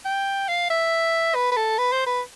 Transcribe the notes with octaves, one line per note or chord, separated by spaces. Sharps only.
G5
F5
E5
B4
B4
A4
B4
C5
B4